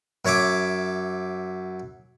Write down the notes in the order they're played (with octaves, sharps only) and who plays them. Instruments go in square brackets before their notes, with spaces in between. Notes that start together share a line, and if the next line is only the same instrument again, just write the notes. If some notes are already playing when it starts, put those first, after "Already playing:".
[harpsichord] F#2 C#5 E5 D6